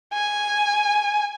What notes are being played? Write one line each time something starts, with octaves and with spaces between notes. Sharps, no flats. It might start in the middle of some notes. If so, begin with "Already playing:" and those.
G#5